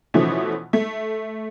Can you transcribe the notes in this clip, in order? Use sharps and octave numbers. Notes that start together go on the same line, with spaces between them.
B2 E3 F3 A3 C#4
A3